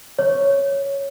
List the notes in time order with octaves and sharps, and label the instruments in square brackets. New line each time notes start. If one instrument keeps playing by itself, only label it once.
[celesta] C#5